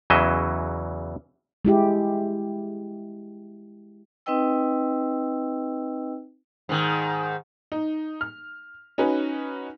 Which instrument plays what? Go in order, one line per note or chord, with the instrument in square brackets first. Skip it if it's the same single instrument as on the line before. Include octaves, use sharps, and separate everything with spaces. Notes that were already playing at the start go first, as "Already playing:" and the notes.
[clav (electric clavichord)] E2 C#3 E3 F#3 D#5 E5
[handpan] G#3 E4 G4
[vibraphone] C4 D#4 B4 D#5 G5 E6
[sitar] G#2 D#3
[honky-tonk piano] D#4
F6
C#4 D#4 F#4 B4